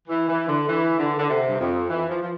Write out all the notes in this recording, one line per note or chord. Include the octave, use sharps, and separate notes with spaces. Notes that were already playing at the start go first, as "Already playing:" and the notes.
E3
E3
D3
E3
D3
D3
C3
G2
F2
E3
F3
F3